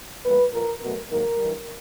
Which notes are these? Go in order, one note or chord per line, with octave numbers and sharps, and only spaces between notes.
A2 E3 G3 A#3 B4
A#2 F3 A#3 A#4
B2 F#3 A3 A#4
G#2 D#3 F#3 A#3 A#4
G2 E3 G3